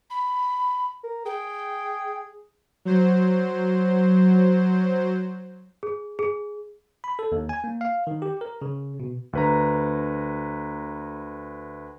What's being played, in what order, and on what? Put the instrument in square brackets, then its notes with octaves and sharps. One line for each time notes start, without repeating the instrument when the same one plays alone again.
[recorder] B5
[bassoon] A#4
[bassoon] G#4 [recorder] G5
[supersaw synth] F#3 C5
[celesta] G#4
G#4
[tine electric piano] B5
A4
D#2
G#5
A#3
F5
D#3
G4
A#4
C#3
B2
[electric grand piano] D2 B4 A#5